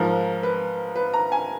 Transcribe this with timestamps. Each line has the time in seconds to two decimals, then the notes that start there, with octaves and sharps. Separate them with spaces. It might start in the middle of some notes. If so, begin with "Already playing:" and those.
Already playing: G#2 F3 A#4
0.43 B4
0.96 B4
1.14 A#5
1.32 G#5